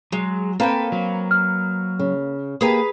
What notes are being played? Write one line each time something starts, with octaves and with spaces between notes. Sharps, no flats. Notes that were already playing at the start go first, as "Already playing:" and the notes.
F#3 G#3
A#3 C4 A4 B4 C5 G5
F#3
F6
C#3
A#3 G4 G#4 B4 A5 A#5